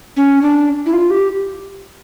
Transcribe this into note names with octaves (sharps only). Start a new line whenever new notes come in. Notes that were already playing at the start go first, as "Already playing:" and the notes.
C#4
D4
E4
F4
G4